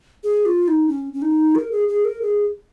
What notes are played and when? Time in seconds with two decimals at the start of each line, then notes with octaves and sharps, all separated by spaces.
0.24 G#4
0.46 F4
0.68 D#4
0.89 C#4
1.13 C#4
1.22 D#4
1.55 A#4
1.72 G#4
1.89 G#4
2.05 A#4
2.22 G#4